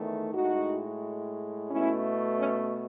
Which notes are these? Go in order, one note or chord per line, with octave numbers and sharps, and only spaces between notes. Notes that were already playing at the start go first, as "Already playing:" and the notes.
Already playing: E2 D#3 A3
A2 G#3 D#4 F#4
B2 A3 C#4 E4
C#4